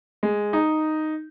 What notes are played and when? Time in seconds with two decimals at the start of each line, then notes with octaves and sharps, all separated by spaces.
0.23 G#3
0.53 D#4